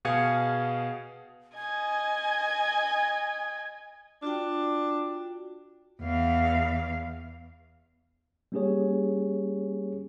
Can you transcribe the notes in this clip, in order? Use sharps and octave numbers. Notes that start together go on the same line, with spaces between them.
B2 G#4 F5 D#6 G#6 C#7
D#5 G#5 G#6
D4 F4 F#4 G5
E2 F5
G3 A#3 C#4 G4 G#4 C#5